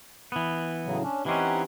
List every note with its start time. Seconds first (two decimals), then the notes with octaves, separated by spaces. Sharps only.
0.32 E3 B3
0.85 A2 C#3 F#3
1.02 C#4 D4
1.26 E3 C4 C#4 D#4 G4 F#5